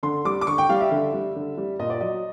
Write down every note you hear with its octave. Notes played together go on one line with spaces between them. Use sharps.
D3 C6
G3 D6
D6
D3 C#6
G5
G3 F5
E5
D3
G3
D3
G3
A#2 D#5
D5
F#3 D#5